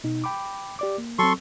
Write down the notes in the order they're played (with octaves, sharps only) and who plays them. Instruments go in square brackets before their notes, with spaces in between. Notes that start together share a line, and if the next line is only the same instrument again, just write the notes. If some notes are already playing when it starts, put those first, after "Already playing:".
[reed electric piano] B2 D#4
G5 B5 D6
G4 D5 D6
A#3
[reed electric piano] F#3 C4 [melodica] A4 C6 C#6